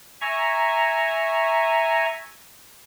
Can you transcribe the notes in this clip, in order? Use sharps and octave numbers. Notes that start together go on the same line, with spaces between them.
E5 G#5 A#5 C#6